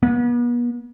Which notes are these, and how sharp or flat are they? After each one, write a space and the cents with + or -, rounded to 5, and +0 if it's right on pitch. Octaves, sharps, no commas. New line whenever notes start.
B3 -40